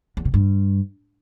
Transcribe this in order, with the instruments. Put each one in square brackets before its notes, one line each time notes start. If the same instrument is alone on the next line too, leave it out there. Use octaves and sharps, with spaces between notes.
[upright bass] E2
C3
G2